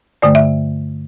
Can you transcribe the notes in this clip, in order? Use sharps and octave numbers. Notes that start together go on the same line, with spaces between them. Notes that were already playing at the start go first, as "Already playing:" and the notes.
G2 D3 A3 D5
E5